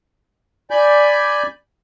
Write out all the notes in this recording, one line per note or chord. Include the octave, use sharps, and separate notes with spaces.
D5 G#5 B5 G6